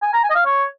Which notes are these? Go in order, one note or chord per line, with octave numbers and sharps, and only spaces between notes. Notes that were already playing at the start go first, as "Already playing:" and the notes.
G#5
A#5
G#5
D#5
F5
C#5